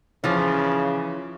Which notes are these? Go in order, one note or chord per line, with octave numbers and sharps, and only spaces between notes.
C#3 E3 F3